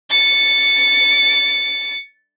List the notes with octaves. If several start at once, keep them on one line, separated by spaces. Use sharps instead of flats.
A6 C#7